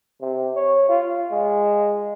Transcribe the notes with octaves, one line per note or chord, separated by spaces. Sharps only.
C3
C#5
F4
G#3